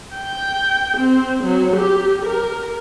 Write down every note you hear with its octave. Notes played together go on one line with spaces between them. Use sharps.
G5
C4
F#3
G4
A#4